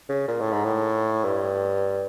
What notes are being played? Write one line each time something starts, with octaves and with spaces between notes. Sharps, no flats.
C#3
A#2
A2
G#2
A2
G2